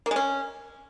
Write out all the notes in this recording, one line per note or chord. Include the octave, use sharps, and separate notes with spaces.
A#3
G#3
C#4